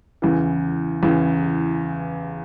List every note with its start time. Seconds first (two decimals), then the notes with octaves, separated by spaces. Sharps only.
0.22 E2 C#3 E3
1.03 E2 C#3 E3